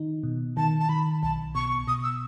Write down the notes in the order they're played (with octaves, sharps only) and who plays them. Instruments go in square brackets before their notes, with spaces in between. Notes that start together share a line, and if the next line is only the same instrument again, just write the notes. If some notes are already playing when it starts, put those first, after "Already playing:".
Already playing: [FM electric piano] D#3 D#4
B2
[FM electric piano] D#3 [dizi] A5
[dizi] A5
[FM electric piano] D#3 [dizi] B5
[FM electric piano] B1 [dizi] A5
[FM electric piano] B2 [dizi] C#6
[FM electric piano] B2 [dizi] D#6
[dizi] E6